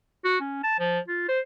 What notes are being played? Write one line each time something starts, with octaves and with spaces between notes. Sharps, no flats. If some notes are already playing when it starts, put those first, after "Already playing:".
F#4
C#4
A5
F3
F4
C5